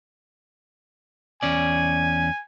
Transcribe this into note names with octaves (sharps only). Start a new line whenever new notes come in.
E2 C#4 D5 G#5